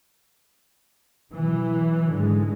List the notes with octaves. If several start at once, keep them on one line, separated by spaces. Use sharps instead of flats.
B2 E3 F#3
G#2 D3 G#3